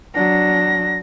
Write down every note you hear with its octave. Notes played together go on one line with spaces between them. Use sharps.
F#3 D4 A#6